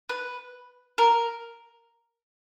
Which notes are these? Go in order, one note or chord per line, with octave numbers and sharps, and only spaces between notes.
B4
A#4